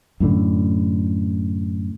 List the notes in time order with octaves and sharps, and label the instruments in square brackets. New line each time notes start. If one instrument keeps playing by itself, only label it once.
[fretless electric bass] F#2 A2 D3